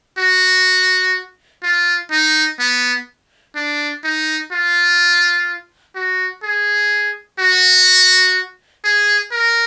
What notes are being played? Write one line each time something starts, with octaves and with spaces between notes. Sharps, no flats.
F#4
F4
D#4
B3
D4
D#4
F4
F#4
G#4
F#4
G#4
A#4